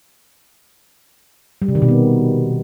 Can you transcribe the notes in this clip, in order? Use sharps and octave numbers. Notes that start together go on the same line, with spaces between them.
G3
C3
D#3
B2
B3